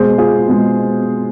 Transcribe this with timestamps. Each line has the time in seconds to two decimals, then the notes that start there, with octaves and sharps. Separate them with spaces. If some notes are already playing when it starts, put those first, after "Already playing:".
Already playing: B2 G#3 G#4 C5
0.18 F4 G#4
0.47 B2 G#3